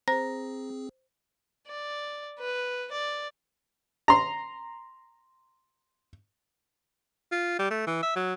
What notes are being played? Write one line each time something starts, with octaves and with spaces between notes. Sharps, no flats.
C4 G#4 C5 A#5
D5
B4
D5
A#5 C6
F4
G3
A3
E3
E5
F#3